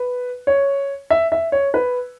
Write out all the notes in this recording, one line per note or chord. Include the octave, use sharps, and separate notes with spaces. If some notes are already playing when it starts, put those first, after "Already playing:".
Already playing: B4
C#5
E5
E5
C#5
B4